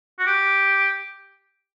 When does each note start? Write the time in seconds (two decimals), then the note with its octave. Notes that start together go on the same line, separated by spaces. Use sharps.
0.19 F#4
0.27 G4